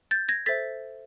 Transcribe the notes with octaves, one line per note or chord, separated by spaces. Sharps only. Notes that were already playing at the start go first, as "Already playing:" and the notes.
G6 A6
G#6 A#6
A4 C5 E5 A6 B6